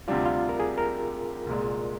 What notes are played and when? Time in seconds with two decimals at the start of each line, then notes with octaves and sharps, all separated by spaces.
0.08 D2 C3 G3 D4 F4
0.26 F4
0.49 A#4
0.60 G#4
0.78 A#4
1.47 C2 A#2 G#3